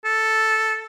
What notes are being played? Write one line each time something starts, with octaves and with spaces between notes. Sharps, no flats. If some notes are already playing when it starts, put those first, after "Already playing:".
A4